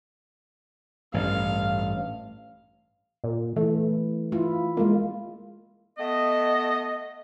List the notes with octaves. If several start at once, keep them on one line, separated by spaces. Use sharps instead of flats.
A1 G2 F5
A#2
E3 A3
E4 F4
G#3 A#3 F4
A3 B3 D#5